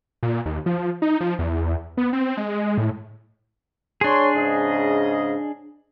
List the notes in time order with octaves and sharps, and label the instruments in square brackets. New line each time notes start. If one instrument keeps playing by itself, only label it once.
[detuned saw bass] A#2
D#2
F3
D#4
F3
E2
B3
C4
G#3
A2
[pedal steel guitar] D4 G#4 [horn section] C#5 C6
[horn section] G#2 C#3 D#5